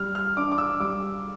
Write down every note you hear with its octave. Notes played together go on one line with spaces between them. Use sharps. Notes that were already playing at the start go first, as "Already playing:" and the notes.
Already playing: G3 F6
F6
D4 D6
D6
E6
G3 D6